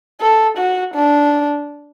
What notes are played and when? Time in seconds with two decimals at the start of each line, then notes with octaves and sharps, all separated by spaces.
0.21 A4
0.58 F#4
0.94 D4